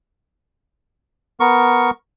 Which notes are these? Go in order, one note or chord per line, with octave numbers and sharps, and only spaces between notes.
B3 A#4 C#6